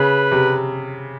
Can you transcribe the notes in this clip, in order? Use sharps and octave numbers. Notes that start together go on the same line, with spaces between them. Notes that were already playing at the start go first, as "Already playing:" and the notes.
Already playing: C#3 B4
C3